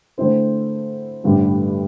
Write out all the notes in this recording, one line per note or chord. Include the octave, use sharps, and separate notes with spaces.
D3 A3 C4 E4 C5
A1 G2 D3 G3